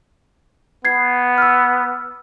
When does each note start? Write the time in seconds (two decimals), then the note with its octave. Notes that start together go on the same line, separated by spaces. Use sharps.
0.85 B3 G#6 C7
1.38 E6 F6